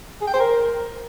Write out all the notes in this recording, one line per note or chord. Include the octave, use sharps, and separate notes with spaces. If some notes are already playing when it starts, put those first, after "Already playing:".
G#4
G5
C5
A#4